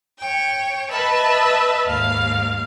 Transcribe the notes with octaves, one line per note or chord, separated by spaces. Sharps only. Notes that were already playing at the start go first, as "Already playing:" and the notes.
C#5 G5
B4 D#5 E5 A5 B5
D#2 G#2 F5